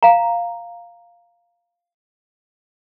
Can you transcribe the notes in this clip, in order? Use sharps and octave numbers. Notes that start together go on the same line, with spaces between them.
F5 A#5